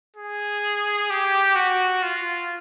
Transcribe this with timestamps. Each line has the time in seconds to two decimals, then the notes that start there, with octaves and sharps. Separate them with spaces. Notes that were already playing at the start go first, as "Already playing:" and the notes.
0.16 G#4
1.10 G4
1.56 F#4
2.02 F4